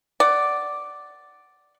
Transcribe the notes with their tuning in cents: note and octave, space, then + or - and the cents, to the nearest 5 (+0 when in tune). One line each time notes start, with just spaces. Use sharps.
D5 +0 F#5 +15